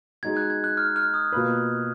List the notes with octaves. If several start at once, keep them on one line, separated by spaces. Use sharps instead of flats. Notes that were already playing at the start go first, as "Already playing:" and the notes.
G#3 D#4 F#4 G#6
F#6
G#6
F#6
F6
F6
D#6
B2 A#3 F4 B4